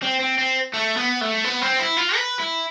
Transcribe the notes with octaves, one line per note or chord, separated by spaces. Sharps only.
C4
C4
C4
A3
B3
A3
B3
C4
E4
F4
B4
E4